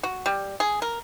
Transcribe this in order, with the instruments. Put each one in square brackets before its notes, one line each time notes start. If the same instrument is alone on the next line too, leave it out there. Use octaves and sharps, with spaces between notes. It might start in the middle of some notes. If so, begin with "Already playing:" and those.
[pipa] F#4
G3
G#4
A#4